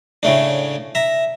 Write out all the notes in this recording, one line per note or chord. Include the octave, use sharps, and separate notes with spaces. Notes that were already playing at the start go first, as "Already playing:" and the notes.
A2 C#3 A3 D4
E5 A#5